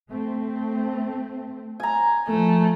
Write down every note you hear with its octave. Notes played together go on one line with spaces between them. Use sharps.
A3 C4
G#5 A#5
F3 A3